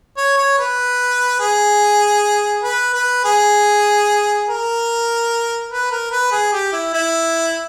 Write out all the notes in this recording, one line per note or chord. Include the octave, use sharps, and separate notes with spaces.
C#5
C#5
B4
G#4
B4
B4
G#4
A#4
B4
A#4
B4
G#4
G4
E4
E4